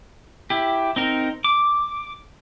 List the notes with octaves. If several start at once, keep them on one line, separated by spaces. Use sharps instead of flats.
E4 G4
C4 D#4 A#4
D6